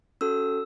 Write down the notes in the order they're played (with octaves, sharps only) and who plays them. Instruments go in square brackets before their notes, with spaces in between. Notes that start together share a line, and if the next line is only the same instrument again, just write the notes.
[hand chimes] C#4 F#4 A4 E6